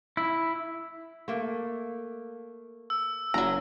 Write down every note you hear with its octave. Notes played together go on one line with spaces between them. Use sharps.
E4
A3 A#3
E6
F#1 F#3 A#5